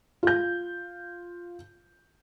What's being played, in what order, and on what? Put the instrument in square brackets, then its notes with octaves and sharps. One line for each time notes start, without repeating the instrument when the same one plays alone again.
[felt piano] F4 G6